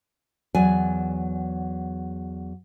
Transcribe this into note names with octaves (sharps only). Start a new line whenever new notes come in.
E2 F#3 D5 G#5